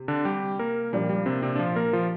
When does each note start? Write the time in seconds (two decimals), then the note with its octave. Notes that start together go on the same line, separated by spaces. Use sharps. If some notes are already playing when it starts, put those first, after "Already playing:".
Already playing: C3
0.08 D3 D4
0.25 G3 G4
0.59 A#3 A#4
0.93 A#2 F3 G3 A#3 D4 G4
1.09 G3
1.26 C3 C4
1.42 C3 C4
1.56 D4
1.59 F3 F4
1.76 A#3 A#4
1.93 F3 F4